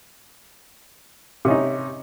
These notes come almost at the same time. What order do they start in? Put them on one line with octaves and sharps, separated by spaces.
C3 C#4 D#4